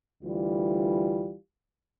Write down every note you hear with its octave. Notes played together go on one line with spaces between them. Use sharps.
D2 E3 G3 F4